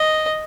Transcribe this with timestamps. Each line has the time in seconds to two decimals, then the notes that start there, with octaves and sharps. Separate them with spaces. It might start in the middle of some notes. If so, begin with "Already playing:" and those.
Already playing: D#5